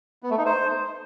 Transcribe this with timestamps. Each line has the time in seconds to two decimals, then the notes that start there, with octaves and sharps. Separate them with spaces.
0.23 B3
0.30 A3
0.38 D#4
0.45 C5